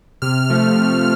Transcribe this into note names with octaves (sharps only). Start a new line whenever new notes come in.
C3 F6
F3 A3
C3